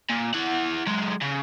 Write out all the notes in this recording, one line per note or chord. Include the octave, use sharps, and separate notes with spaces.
A#2
E4 F#5
F#3 G#3
C#3